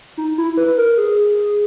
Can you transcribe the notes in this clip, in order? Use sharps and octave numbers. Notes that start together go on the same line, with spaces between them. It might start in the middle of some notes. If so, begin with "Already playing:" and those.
D#4
E4
B4
A#4
G#4